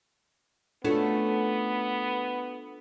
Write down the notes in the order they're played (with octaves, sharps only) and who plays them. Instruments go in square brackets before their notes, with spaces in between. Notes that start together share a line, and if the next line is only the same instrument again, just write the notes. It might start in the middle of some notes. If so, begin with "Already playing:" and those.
[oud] A3 C#4 F#4 [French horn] B3 [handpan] D4 F4 A4